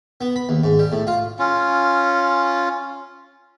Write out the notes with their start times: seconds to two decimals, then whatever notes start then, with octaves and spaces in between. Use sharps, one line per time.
0.21 B3
0.36 B5
0.49 D#2
0.64 G#2
0.79 G3
0.92 A2
1.07 F4
1.39 C#4 F4